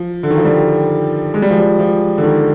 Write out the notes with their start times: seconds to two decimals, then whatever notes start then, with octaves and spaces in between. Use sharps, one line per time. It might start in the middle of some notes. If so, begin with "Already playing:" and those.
Already playing: F3
0.23 D3
0.30 D#3
0.37 F3
0.45 G3
1.34 G#3
1.42 G3
1.50 F3
1.58 G3
1.79 F3
2.18 D3
2.24 D#3